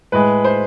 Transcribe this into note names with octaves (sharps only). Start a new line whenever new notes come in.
A2 G#3 B4
C5